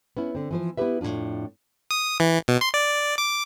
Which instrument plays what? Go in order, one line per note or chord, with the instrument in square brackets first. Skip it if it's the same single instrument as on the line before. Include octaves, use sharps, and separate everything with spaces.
[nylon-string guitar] B3 C#4 E4
D3 C4
E3 F3 C5
B3 E4 F4 G4 B4 E5
F2 A2 G3 D4 F4
[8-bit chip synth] D#6
E3
B2
C6
D5
D6